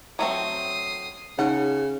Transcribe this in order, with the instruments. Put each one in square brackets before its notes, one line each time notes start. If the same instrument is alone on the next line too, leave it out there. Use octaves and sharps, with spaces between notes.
[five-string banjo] F#3 A3 C4 [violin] D#6 C7
[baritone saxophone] C#3 [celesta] D#4 [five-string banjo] F#5